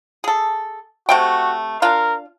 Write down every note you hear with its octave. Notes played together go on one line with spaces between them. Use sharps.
G#4 A4
C3 A3 F#4 G5
D4 F4 A#4 F5